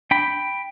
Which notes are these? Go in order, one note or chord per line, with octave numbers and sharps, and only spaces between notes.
D4 G5 B5